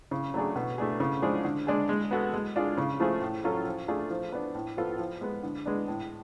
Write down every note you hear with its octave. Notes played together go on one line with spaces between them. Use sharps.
C#3
F#3 A3 D4 G#4
B2
A3 D4 G#4
C#3
F3 G#3 D4 G#4
D3
G#3 D4 G#4
G#3
B3 F#4 A4
G#3
D4 F4 G#4
C#3
F3 A3 F4 G#4
A2
F#3 C#4 F4 A4
F3
A3 D4 F4 G#4
F3
B3 D4
A2
F3 B3 F4 A4
F3
G#3 B3
D3
G#3 B3 D4
A2